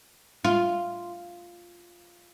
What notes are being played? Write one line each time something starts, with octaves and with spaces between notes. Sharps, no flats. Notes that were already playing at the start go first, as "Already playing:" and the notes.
F4